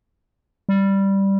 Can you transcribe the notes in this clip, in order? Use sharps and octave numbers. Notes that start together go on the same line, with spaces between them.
G3